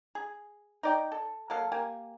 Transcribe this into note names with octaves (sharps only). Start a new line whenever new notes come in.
G#4
D#4 D5 G5
A4
F#3 A#3 A4 F5
A#3 G4 G#5